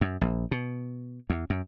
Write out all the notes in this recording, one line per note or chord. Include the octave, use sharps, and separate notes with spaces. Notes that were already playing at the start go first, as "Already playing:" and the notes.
F#2
A#1
B2
E2
F#2